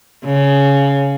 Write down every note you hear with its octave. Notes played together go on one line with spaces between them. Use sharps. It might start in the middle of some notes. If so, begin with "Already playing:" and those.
C#3